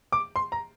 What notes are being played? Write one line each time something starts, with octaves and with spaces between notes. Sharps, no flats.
D6
C6
A#5